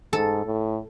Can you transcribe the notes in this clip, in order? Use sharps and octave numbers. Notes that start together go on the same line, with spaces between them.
G#2 A4
A2